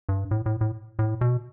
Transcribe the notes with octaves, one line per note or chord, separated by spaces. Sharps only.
G2
A2
A2
A2
A2
B2